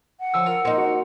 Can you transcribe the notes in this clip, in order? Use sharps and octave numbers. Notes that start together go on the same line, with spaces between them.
F#5
D3 F3 C#4 E6 C#7
F4 A#4 A#5
A#3 C4 D#4 A#4
F#4